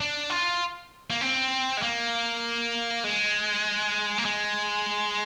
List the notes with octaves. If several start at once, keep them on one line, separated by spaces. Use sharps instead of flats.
D4
F4
A#3
C4
G#3
A#3
G#3
A#3
G#3